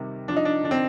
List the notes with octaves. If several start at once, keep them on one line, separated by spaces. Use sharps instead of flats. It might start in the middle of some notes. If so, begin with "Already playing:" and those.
Already playing: C3 D#3 G3
F3 D4
D#4
D4
D3 D4
C4